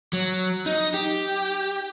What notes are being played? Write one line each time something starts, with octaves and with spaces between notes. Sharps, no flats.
F#3
D#4
G4